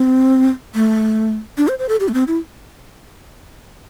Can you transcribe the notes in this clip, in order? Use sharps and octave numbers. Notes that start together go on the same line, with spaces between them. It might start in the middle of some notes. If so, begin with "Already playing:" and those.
Already playing: C4
A3
D4
C5
C5
A4
G4
A3
C4
E4